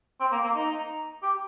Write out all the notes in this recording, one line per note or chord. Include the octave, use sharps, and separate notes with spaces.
C4
A#3
A#3
D#4
G4